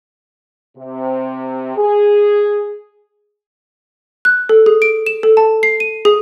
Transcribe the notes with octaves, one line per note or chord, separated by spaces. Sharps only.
C3
G#4
F#6
A4
G#4
D7
E7
A4
A5
C7
D#7
G#4